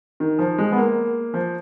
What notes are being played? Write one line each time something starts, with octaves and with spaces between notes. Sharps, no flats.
D#3
F3
G#3
B3
A#3
F3